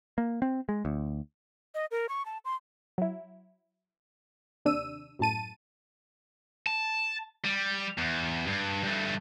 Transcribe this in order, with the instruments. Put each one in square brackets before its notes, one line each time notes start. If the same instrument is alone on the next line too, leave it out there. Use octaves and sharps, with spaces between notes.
[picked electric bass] A#3
C4
G#3
D2
[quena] D#5
A#4
C#6
A5
C6
[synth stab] F#3 E4
D#2 C3 D4 E6 D#7
F#2 A2 A5 D#7
[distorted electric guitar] A5
G3
E2
G2
G2 A3